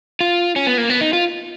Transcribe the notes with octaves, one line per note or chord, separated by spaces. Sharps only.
F4
C#4
B3
A#3
B3
D#4
F4